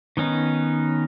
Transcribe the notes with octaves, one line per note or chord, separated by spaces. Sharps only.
D#3 B3 C#4 D#4